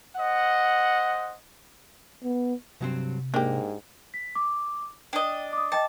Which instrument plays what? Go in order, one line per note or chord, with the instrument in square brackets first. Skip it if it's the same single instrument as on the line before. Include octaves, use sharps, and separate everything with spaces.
[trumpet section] C5 D#5 F#5
[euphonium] B3
[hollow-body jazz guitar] G2 F#3 C4 [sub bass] C3
[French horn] G#2 [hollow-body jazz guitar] A#3 [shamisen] D4 G4
[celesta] B6
D6
[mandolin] D4 D#5 [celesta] G5
[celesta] D6 D#6
[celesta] D#5 G5 D6 [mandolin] A5